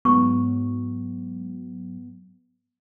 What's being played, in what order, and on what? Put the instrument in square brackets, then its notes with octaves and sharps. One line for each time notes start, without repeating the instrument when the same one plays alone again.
[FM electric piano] G#2 F#3 [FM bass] B3 [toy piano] C#6